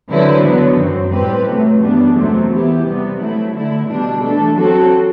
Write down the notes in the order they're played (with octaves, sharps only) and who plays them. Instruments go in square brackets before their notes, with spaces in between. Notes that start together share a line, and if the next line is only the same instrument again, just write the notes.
[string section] D3 F#3 C4 E4 B4
D3 F#3 B3
F#2 F#3 C4
A2 G3 C4 G4 B4
C3 F#3 A3
F#2 E3 G3 B3 D4
E2 C3 F#3 A3 C4
E3 B3 E4 G4
C3 G3 B3
F#3 A3 E4
D3 A3 E4
B2 G3 D4
E3 A3 D4 A4
F#3 C4 F#4 A4